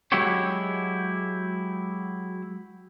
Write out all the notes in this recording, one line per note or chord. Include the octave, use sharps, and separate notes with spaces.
F#3 G#3 E4 F#4 G4 C#5